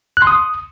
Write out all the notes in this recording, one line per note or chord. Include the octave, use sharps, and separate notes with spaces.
F#6
C6
D#6